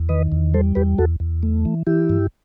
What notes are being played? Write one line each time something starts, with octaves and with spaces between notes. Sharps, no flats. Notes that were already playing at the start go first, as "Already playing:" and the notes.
Already playing: E2
D#3 B4 D#5
E2
G3 A4 C5
E2 G4 B4
E2 F#4 A4
E2
A3
E3
E3 E4 G4
G2